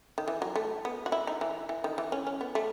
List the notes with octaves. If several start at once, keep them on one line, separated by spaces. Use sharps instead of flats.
D#3
E3
F#3
A3
B3
F#4
E4
D#4
E3
E3
D#3
E3
C#4
C#4
B3
A3